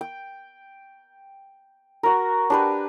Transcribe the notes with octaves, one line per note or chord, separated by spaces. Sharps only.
G5
F#4 A#4
D4 G4 B4